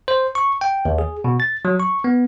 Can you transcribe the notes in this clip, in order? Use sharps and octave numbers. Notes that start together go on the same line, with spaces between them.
C5
C#6
G5
D#2
G#4
B2
A6
F#3
C#6
B3